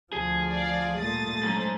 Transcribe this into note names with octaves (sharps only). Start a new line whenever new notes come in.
D2 F3 G#4
D5 F5
A#2 G3 A3 D#6 A6
G#2 F#3 C#4